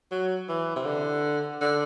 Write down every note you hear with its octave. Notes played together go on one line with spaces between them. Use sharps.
F#3
E3
C3
D3
D3